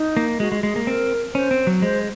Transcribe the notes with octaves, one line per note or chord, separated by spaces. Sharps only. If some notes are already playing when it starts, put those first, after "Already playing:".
Already playing: D#4
A#3
G#3 F#4
G#3
G#3 G#4
A#3
C4 A#4
C#4 C5
C4
F#3
G#3 C5